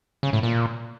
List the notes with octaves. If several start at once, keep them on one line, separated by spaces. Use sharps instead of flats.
C#3
A2
A#2